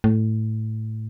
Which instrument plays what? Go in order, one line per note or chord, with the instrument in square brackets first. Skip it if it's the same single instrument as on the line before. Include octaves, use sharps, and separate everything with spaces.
[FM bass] A2